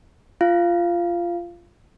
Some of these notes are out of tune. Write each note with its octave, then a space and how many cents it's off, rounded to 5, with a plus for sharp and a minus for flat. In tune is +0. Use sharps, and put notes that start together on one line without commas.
F4 -15 F5 -15